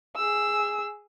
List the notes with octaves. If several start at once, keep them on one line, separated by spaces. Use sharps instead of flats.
G#4 E6